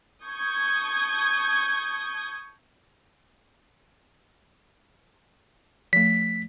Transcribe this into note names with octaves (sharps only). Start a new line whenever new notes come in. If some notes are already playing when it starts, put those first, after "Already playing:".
A5 C#6 D#6 G6 G#6
F3 A3 B6